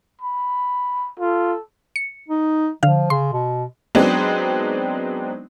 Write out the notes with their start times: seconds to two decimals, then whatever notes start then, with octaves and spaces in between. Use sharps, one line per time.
0.21 B5
1.20 F4 A4
1.96 C#7
2.28 D#4
2.83 D3 F3 F5
3.10 C#3 C6
3.33 B2
3.95 F#3 G#3 B3 C4 D4 D#4